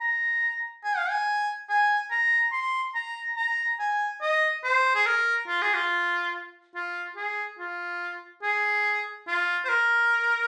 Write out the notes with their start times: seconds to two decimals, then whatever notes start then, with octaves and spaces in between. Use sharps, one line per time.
0.01 A#5
0.84 G#5
0.98 F5
1.10 G#5
1.69 G#5
2.11 A#5
2.53 C6
2.95 A#5
3.37 A#5
3.79 G#5
4.22 D#5
4.64 C5
4.95 G#4
5.06 A#4
5.48 F4
5.62 G#4
5.74 F4
6.75 F4
7.16 G#4
7.59 F4
8.43 G#4
9.28 F4
9.65 C5
9.69 A#4